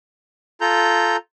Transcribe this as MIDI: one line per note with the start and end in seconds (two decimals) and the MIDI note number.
0.61 1.17 65
0.61 1.17 69
0.61 1.17 82
0.61 1.17 91